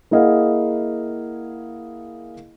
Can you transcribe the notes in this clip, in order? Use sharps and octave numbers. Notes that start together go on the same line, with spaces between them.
A#3 E4 G#4 D#5 F5 F#5